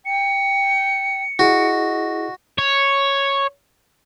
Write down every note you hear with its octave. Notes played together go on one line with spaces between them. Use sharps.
G5 C#7
E4 F#4 G#4 D#5
C#5